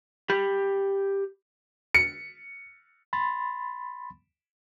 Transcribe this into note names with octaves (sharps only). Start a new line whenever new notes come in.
G4 B5
C#7
B5 C6 A6